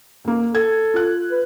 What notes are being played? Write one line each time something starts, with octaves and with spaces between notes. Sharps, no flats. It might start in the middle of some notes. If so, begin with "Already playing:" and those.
D#2 A#3
A4 G#6
F4 F#6
B4